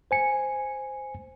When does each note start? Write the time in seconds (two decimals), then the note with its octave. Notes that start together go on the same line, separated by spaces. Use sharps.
0.11 C5 G#5 C#7